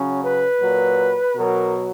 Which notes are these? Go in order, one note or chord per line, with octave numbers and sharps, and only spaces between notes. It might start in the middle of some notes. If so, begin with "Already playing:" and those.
Already playing: C#3 F#3 C#4
B4
A#2 F#3
B2 F#3 A#4